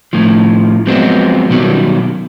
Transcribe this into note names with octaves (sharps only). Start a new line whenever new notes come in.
A2 D#3 F3
F3 F#3 G#3 B3 C4
B2 D#3 F#3 G3